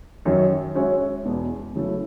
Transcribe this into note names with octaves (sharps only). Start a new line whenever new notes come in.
F#2 D#3 F#3
G#3 C#4 F#4 C#5 E5
E2 B2 G#3 B3
C#3 F#3 A3 E4 A4